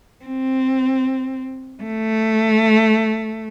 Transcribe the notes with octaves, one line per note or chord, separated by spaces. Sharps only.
C4
A3